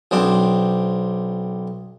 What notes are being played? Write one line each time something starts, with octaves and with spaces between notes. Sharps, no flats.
B1 C4 D4